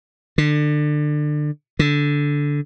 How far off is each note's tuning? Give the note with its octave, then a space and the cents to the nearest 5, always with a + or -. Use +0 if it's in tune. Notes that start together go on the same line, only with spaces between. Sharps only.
D3 +25
D3 -10